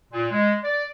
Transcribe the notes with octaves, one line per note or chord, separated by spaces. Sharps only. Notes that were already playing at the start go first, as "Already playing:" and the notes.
A#2
G#3
D5